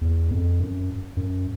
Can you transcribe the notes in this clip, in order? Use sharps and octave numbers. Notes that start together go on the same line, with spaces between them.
E2
F2
F#2
F#2